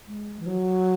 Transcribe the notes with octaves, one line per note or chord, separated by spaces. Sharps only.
G#3
E3
F#3